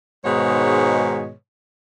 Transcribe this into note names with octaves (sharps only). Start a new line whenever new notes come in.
G#2 B2 D#3 G#3 C#5